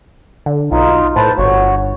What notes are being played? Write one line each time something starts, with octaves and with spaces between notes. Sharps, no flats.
D3
B1 D#4 F4
A2 B4 C5 A5
G1 F#4 C#5